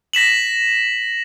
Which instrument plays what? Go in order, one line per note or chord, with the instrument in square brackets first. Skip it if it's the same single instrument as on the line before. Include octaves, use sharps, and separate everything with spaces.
[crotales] A#6 B6 E7 F#7